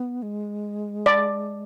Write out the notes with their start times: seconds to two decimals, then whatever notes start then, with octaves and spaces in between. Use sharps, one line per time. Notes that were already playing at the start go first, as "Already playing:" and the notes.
Already playing: B3
0.22 G#3
1.06 D5